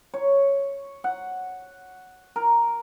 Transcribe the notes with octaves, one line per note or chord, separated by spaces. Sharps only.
C#5
F#5
A#4